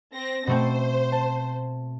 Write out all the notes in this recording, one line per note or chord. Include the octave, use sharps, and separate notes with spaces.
C4 A#6
B2 A3 C4 C5
A5